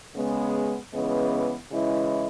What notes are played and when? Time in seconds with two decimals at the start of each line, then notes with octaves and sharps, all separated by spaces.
0.15 C#3 G#3 B3
0.93 C#3 E3 G#3 B3
1.71 C#3 E3 G#3 E4